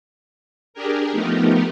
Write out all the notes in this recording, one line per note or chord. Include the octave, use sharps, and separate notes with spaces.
D4 G4 G#4 A#4
F3 A3 B3 D#4 G4 A#4